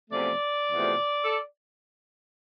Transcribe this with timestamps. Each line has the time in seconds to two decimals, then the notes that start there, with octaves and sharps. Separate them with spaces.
0.10 E2 C3 F3 A3 D5
0.72 E2 C3 F3 A3
1.24 A4